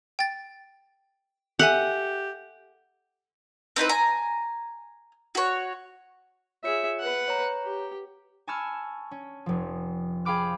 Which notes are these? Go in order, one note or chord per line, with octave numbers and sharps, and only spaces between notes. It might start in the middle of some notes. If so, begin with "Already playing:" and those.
G5 A6
G4 A4 E5 F#5 G#5
C4 D#4 E4 B4
G#5 A#5
F#4 C#5
F4 G#4 C#5 E5 C#7
B4 F#5
C#5 A#5
G4
G#5 A5 B5 C#6 E6 F6
C#4
F1 F3
G#4 F5 G5 B5 D6 F6